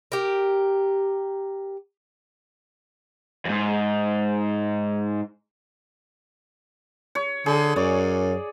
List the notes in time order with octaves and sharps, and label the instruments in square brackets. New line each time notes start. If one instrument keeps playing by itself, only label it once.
[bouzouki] G4 A#4
[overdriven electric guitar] F2 G#2
[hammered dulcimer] C#5
[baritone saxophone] D3 [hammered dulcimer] G#4
[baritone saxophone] F#2 [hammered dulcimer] C#5 D5